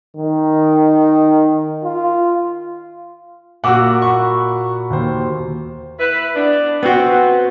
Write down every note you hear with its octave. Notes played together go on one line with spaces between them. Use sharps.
D#3
F4
A#2 F#4 F#5 D6 E6
F#5 B5 C#6
D#2 C5
E4 B4
B3 D4
B3 C4 F#4